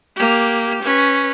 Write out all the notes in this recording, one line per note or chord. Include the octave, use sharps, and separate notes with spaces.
A#3 G4
C#4 B4